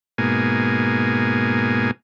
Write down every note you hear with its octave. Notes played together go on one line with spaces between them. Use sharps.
G#2 B2 A#3 G#5